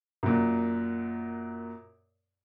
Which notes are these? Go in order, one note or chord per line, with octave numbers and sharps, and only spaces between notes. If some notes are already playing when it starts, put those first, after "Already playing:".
F#2 A#2